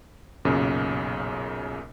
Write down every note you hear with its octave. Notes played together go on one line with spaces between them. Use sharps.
B1 F#2 A#2 C#3